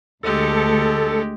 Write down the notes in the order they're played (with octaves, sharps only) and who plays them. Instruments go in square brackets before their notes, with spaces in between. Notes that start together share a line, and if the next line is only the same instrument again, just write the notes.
[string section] D2 [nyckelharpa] G#3 G4 [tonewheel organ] A4